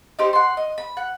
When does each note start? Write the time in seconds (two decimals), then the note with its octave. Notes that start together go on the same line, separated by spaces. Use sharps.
0.19 D#4 G4 C5
0.33 F#5 C6
0.57 D#5
0.78 B5
0.97 F#5